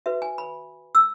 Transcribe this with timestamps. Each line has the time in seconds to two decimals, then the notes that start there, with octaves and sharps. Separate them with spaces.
0.06 F#4 B4 E5
0.22 G#5
0.38 B5
0.95 E6